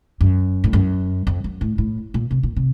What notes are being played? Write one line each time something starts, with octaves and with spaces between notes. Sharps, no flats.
F#2
A2
F#2
F2
F#2
A2
A2
A#2
C3
A#2
C3